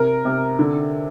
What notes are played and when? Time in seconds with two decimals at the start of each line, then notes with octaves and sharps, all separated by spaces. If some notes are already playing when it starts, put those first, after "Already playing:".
Already playing: C3 A#4
0.25 C3
0.59 D3